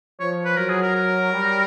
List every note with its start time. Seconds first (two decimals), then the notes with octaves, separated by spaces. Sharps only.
0.20 F3 C#5
0.45 B4
0.57 F#3 A#4
0.69 G#4
0.83 A#4
0.95 A#4
1.32 G3